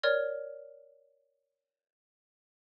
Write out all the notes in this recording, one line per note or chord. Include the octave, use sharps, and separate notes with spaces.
A#4 C#5 D5 F6 G#6